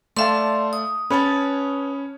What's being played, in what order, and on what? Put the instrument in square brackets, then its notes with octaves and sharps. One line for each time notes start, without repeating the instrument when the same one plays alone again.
[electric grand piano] A3 F5 [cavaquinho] D5 A5 [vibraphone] E5 C6
[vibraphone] D#6
[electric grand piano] C#4 C#5 [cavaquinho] B4 A5